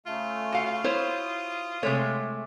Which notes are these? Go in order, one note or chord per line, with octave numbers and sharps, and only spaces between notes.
C#3 A3 F4
F#4 F5
E4 C5 C#5 D#6
C3 G#3 A3 C#5